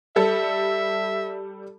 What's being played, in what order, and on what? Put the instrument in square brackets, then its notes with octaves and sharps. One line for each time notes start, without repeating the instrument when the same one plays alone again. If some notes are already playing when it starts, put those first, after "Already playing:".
[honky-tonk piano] G3 A4 [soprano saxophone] E5